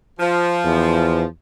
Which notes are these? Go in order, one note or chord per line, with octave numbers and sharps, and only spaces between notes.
F3
E2